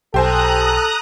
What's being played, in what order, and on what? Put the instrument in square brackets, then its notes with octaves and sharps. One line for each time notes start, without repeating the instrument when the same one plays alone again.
[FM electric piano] B1 [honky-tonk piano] G4 C5 G#5 [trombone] A4 [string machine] A#5 D#6 F#6